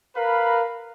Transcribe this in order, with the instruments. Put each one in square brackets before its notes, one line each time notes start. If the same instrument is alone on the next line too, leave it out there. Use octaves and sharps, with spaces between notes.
[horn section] A#4 B4 F5 B5